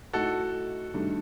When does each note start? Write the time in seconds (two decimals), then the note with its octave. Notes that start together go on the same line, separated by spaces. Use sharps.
0.13 A2 A3 D#4 F#4 A4
0.94 G2 D#3 A3 D4